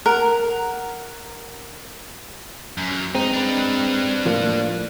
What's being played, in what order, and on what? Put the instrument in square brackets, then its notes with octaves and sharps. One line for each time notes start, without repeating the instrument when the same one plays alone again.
[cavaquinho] A#4 F#5
[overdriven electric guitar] F#2
[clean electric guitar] G#3 C4 [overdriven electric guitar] D#4
[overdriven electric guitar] D4 B4
[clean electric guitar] A2 F3 A#3